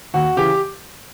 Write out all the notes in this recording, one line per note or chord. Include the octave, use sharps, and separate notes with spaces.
D#2 F#4
C#3 E3 G4